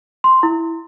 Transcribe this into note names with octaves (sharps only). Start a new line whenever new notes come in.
C6
E4